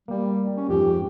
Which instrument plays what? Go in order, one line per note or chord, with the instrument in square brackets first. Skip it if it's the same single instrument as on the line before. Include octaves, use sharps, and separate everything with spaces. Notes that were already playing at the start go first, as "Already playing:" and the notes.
[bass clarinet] G3 [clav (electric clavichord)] A#3 G4
[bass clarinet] C#4
[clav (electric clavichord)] F2 G#2 [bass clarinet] G4